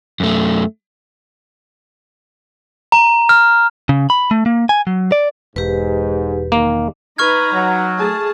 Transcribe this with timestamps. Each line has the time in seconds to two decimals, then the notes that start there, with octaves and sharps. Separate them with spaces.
0.20 F#2 A3
2.92 A#5
3.29 F6
3.89 C#3
4.10 B5
4.31 A3
4.46 A#3
4.69 G#5
4.87 F#3
5.12 D5
5.56 E1 G#2 G4 B4
6.52 D#3 A#3
7.18 D#4 B4 A#5 C#6 F6 G#6
7.53 F#3
7.97 A3 G#4 A5